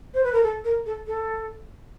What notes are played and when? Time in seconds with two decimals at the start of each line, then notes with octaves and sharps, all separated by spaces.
0.14 C5
0.24 B4
0.33 A#4
0.43 A4
0.64 A#4
0.86 A4
1.07 A4